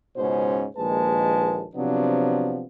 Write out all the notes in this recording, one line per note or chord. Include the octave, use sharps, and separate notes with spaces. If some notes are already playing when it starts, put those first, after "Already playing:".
C#2 G#2 B2 C#4 C5
A#1 D#2 G#3 B4 A5
C3 F3 F#3 B3 D4